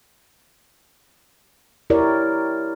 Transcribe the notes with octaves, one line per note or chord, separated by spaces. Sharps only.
E4 G4 A#4 C#5 D5